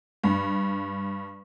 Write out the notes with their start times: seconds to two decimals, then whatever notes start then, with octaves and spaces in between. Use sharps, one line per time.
0.24 G2